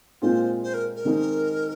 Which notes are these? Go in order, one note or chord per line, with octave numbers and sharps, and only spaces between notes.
A#2 G#3 C4 F4 C5
C5
A#4
A#4
D#3 G#3 C4 D#4